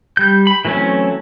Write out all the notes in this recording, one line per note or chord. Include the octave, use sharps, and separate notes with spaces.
G3 G6
B5
E3 F#3 A3 C4 C#4